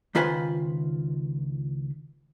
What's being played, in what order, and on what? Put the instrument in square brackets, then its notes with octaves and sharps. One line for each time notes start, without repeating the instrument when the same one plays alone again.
[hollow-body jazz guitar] C#2 D#3 F4 B4 C5 G#5